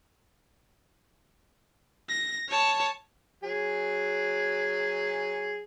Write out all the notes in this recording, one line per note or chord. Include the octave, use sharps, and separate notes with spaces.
A#6
C#5 A5
F#3 G#4 G#5